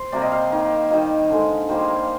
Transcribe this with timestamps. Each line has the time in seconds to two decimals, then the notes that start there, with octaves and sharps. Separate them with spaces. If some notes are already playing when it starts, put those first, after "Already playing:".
Already playing: C5
0.12 C3 G3 A#3 D5
0.22 D#5
0.31 F5
0.51 D#3 A#3
0.90 D#3 G3 A#3 D#5
1.30 D3 G#3
1.68 D#3 G3 A#3 C5
1.79 G#4
1.88 A#4